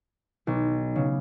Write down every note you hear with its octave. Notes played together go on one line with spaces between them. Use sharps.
B1
C#3